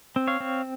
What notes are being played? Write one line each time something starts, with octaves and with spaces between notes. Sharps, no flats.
C4
C#5 F5
C4